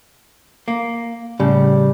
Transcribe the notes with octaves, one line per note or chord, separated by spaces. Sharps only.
A#3
A2 C#3 G3